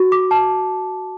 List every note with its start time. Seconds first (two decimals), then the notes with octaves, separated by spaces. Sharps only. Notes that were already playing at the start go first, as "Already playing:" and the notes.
Already playing: F#4
0.12 D6
0.31 A5